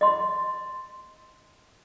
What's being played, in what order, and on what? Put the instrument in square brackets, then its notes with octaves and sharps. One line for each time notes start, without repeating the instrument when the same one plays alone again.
[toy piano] D#5 C6